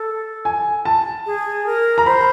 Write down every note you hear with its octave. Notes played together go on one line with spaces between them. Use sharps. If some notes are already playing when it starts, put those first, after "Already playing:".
Already playing: A4
G#5
A5
G#4
A#4
A#5
C5 B5